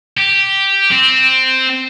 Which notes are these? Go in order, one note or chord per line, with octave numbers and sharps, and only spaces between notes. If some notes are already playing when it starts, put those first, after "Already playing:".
G4
C4